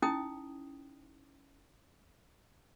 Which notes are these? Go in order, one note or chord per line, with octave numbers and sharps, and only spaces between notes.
C#4 D#4 E4 G5 D#6